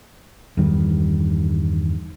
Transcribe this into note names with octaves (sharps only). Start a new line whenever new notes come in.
E2 G2 D#3 G3